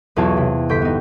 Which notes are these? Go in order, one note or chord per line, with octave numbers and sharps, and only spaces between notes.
B1 E2 F4 C#5 A5 G#6
C3
G1 G5 C6 B6
B3 D#4